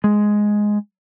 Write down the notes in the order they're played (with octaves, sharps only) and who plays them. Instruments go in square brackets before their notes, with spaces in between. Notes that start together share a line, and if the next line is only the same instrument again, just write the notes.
[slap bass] G#3